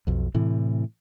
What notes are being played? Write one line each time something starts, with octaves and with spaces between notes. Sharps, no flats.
B1 F2
A2 C3 E3